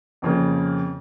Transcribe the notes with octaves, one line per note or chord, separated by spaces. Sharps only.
F2 C#3 F3 A#3